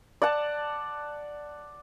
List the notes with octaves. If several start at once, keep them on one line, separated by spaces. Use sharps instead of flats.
D5 F#5 A5